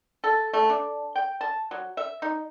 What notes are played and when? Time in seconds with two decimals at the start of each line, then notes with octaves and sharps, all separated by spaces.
0.24 A4
0.54 A3
0.69 D4
1.16 G5
1.41 A5
1.71 F#3
1.97 E5
2.22 D#4